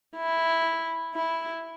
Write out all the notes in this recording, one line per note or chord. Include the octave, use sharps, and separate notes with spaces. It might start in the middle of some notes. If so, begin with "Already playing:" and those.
E4
E4